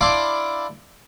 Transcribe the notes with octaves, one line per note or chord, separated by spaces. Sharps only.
D4 E4 F5 C6 D6